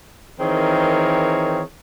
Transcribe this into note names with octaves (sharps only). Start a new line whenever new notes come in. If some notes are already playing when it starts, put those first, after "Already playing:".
D#3 E3 C4 G#4 A#4 C#5